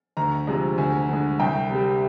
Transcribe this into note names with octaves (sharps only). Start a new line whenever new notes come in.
D2 A#5
C3 F3 G#3
D2 G#5
D3 G#3
C2 G5
C3
G3